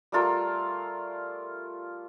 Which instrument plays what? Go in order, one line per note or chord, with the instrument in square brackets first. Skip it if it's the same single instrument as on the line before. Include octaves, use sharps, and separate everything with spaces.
[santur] G3 A3 F4 A#4